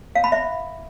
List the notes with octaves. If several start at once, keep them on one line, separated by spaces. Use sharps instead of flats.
F5
B5
E5